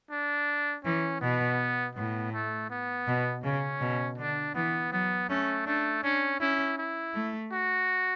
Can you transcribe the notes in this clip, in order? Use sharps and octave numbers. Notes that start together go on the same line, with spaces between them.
D4
E3 C#4
B2 B3
A2 B3
A3
B3
B2
C#3 C#4
B2
D3 D4
E3 B3
F#3 B3
A3 C#4
A3 D4
C#4 D4
C#4 E4
E4
A3
F#4